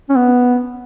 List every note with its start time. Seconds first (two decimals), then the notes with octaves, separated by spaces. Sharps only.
0.09 C#4
0.16 B3